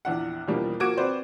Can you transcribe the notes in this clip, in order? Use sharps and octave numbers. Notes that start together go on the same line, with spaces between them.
A#1 E2 D4 F#5
E2 B2 F3 G3 A#3 D4
F3 A#3 F#4 D6 G#6 D7
C4 F#4 B4 C5 D5